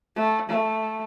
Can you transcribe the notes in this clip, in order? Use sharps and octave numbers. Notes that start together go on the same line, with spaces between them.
A3
A3